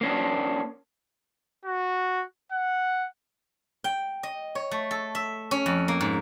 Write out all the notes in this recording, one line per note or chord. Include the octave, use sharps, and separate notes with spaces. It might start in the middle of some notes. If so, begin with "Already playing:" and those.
A#3 C#4 D4
F#4
F#5
G5
D#5
C#5
A3
A4
E5
C#4
F2
A#3
G#2